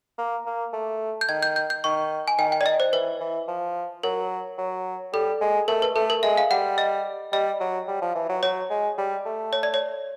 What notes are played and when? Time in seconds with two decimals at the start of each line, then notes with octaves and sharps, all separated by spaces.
0.19 A#3
0.46 A#3
0.73 A3
1.21 G6
1.29 D#3 G#6
1.43 G6
1.56 G6
1.70 G6
1.84 D#3 C#6
2.28 G#5
2.39 D#3 G5
2.52 G5
2.61 D5
2.66 D#5
2.80 C5
2.93 E3 B4
3.21 E3
3.48 F3
4.03 F#3 A#4
4.58 F#3
5.13 G3 A4
5.41 G#3
5.68 A3 A#4
5.82 B4
5.96 A3 A4
6.10 A#4
6.23 G#3 E5
6.37 F5
6.51 G3 F#5
6.78 D#5
7.33 G3 D#5
7.60 F#3
7.88 G3
8.02 F3
8.15 E3
8.29 F#3
8.43 F#3 C#5
8.70 G#3
8.98 G3
9.26 A3
9.53 C#5
9.63 D5
9.74 C#5